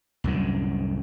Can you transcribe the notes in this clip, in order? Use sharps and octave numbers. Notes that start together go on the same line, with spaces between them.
C2 F#2 A2 D3